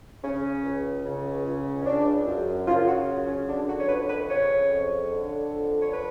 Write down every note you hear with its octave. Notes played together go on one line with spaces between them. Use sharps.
C#3 C#4
C#2
C#3
C#2
C#4
C#3 D4
F#2
C#3 F4
F#4
F#2
C#4
D3 D4
F#4
C#5
F2 B4
B4
C#3 C#5
F2
D3
F2
C#5
D3 B4